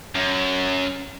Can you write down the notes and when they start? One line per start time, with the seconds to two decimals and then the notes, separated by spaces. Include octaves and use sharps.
0.15 F#2